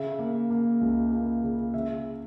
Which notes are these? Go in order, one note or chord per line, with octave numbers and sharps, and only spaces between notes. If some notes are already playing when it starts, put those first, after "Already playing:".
Already playing: C#3 E5
A#3
A#3
C#2
A#3
C#3
C#3 E5